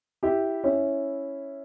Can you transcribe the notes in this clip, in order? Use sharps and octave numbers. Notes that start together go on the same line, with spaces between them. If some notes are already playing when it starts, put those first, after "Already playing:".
E4 G4
C#4 E4